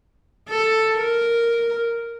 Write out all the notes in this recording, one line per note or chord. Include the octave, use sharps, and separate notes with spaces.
A4
A#4